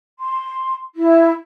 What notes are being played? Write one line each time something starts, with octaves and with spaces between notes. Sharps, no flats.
C6
E4